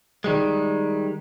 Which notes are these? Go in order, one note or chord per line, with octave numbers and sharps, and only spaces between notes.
D#3 G3 G#3